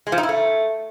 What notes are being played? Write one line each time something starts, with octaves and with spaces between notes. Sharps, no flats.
G#3
F3
D#4
E4
A3